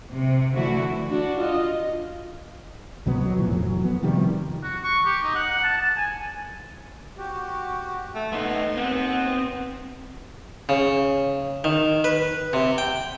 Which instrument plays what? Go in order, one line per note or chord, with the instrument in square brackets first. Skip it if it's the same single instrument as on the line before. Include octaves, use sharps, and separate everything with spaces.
[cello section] C3
D3 E3 A3 E4 F#4
[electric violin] D4 F#4
F4 D#5
[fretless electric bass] C2 B2 F#3 B3
D1 F#3
A2 E3 F3
F1 F2 F#3
B3
C3 D#3 F3 G3
[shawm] F#4
C#6
G4
D#4
F#5
F#5
A5
A5
G#5
[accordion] F#4 G4
[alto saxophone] A3
[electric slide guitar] A3 D#4 [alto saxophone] B3 [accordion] C6
[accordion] D#2 [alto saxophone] B3 [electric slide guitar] C4
[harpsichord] C#3
D#3
B4
C3
G5